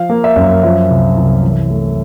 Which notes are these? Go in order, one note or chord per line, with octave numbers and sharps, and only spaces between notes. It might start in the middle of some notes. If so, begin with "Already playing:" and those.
Already playing: F3 F5
A#3
E5
F#2
F3 E5
C2
C2
E3
A3